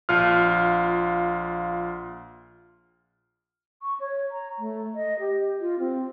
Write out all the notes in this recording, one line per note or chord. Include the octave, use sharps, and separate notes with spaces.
A#1 F4 F6
C#6
C#5
A#5
A3
D#5
G4
F4
C4